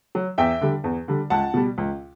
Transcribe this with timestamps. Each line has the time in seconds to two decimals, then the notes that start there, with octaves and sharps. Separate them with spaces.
0.15 F#3
0.38 E2 E5 G5
0.61 D3 G3
0.84 E2
1.08 D3 G3
1.30 C#2 F#5 A5
1.54 B2 G3
1.78 C#2